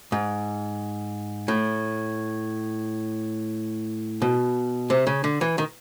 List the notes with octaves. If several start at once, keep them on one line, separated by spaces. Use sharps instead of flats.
G#2
A2
B2
C3
C#3
D3
E3
D#3